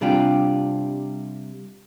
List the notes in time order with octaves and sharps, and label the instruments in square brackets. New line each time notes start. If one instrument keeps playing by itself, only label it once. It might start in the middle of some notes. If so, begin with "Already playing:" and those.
[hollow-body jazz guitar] C3 G3 D4 F4 G4